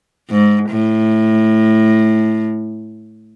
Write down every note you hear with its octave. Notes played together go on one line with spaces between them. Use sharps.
G#2
A2